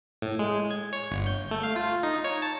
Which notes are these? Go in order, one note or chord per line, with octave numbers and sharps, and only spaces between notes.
A2
G#3
G#6
C#5
G1
G6
A3
F5
F4
D#4
C#5
A5